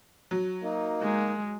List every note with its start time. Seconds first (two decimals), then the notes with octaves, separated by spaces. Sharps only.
0.31 F#3
0.63 A#3 D#4
1.02 G#3